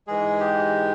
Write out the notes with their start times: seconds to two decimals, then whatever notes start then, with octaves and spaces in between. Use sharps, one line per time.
0.07 G#2 E3 G#3 G#4
0.40 G4